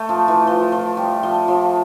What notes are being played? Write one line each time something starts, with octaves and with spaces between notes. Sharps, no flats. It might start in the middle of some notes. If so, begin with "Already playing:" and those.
Already playing: A3
F3
E3
F3
F3
G3
F3
F3